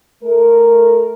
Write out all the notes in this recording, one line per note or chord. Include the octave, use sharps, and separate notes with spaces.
A3 A#4